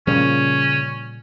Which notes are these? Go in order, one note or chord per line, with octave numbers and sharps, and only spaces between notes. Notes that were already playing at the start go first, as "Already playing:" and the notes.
A#2 C#3 F3 G3 C#4